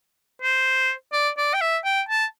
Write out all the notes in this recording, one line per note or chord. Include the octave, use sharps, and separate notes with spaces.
C5
D5
D5
G5
E5
G5
A5